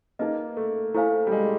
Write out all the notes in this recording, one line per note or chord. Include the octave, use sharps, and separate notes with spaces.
A#3 D#4 G#4 B4 D#5
A3
A3 E4 A4 C5 F5 G#5
G3
G#3